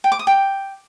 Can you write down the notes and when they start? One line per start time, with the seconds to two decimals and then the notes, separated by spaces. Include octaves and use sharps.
0.04 G5
0.12 D6
0.19 D#6
0.27 G5